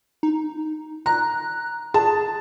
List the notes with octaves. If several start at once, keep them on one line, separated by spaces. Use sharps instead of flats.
D#4
A#5 F#6
G#4 A5